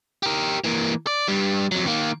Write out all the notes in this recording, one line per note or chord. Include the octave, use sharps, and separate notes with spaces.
G4 A#4
E3 A#3
D5
G2 G3
F2 F#3
D#3 A#3